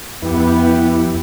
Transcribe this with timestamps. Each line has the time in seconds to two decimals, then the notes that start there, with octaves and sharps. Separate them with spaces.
0.22 F2 B3 E4 G4 B4